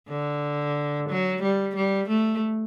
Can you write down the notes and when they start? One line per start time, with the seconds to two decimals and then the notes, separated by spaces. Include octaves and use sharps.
0.09 D3
1.09 F#3
1.43 G3
1.75 G3
2.09 A3